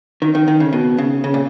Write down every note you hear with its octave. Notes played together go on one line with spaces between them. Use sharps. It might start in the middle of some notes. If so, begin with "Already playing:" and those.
D#3
D#3
D#3
C#3
B2
C#3
C#3
A#2